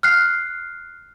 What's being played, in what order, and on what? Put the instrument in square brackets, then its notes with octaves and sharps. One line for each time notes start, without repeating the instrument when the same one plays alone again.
[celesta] F6 F#6 C7